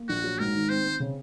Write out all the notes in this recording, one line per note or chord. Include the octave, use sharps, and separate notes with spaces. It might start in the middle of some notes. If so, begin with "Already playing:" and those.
Already playing: A#3
A#1 F#4
F#3
G#2 A#4
D#3
C4 C5
C4
C#3